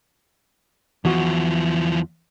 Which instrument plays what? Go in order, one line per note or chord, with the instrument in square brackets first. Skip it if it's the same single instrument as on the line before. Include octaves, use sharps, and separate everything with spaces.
[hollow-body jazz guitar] E2 F#4 [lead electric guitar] E3 F3